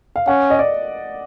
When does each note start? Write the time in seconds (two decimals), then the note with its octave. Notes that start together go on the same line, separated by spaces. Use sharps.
0.16 F5
0.28 C#4 F#5
0.50 D#5
0.59 D5